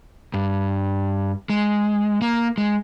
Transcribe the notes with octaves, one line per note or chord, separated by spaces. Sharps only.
G2
G#3
A#3
G#3